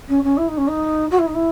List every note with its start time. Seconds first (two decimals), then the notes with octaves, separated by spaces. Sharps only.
0.08 C#4
0.23 C#4
0.37 E4
0.48 D#4
0.57 C#4
0.67 D#4
1.10 F#4
1.18 E4
1.26 D#4
1.34 E4